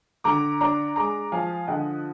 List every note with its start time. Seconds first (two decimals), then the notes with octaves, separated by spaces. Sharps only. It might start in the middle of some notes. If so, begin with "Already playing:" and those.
0.24 D3 A#5 D6
0.61 D4 A#5 D6
0.96 G#3 A#5 D6
1.32 F3 F5 G#5
1.67 D3 D#5 F#5